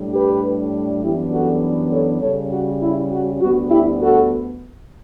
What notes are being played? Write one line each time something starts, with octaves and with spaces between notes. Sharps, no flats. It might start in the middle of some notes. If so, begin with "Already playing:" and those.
Already playing: A2 G3 D4
G4 B4
F#2 E3 G3 B3 D4 E4 G4
F#4 A4
A4 C#5
C#3 G3 C#4 A4 C#5
F#4
E4
F#4
D2 D3 G3 B3 F#4
E4 G4
F#4 A4